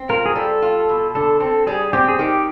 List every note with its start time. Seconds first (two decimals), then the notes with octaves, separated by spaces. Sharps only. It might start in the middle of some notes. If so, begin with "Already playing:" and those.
Already playing: C4
0.09 F4 A#4
0.26 G#4
0.36 G3 A4
0.62 F4
0.89 B2
1.15 D3 A4
1.40 C4 A4
1.67 G3 G#4
1.93 C4 G4
2.08 G#4
2.19 D#3 G4